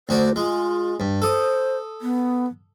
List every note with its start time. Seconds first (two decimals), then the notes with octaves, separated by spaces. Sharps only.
0.09 D2 F#4 C5 D5
0.36 G#3 F4
1.00 G2
1.22 A4 C5 D#6
2.01 B3